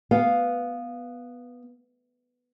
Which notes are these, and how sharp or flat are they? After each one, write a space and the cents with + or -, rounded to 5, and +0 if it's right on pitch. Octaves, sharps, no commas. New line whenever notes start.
B3 +0 F5 +0